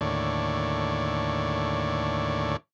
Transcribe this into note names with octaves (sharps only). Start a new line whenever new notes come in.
D#2 A2 D3 C#5 D5